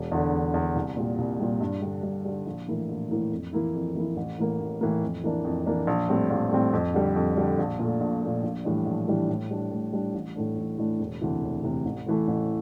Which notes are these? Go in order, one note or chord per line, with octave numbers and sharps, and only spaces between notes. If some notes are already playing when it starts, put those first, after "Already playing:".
Already playing: E1
E2 D3
E1
E2 D3
C2
A#2 G3
C2
A#2 G3
G2
D3 G3
G2
D3 G3
A#1
A2 E3 A#3 E4
A#1
A2 E3 A#3 E4
F2
E3 A#3 E4
F2
E3 A#3 E4
A1
A2 E3 A#3
A1
A2 E3 A#3
F2
E3 A#3 D4
F2
E3 A#3 D4
A#1
A2 G3 C4
A#1
A2 G3 C4
F2
D3 G3
F2
D3 G3
A#1
A#2 A3
A#1
A#2 A3
A#1
A2 E3 G3 D4
A#1
A2 E3 G3 D4
A2
G3 D4
A2
G3 D4
A1
A2 E3 A3 D4
A1
A2 E3 A3 D4
E1
D2 C3 E3
E1
D2 C3 E3
A1
A2 E3 A3
A1